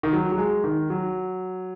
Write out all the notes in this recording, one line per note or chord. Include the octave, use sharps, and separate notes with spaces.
D#3
F#3
F#3
G#3
D#3
F#3